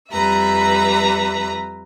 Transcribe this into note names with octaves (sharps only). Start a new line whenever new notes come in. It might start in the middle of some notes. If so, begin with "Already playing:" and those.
F2 G3 B4 E5 A#5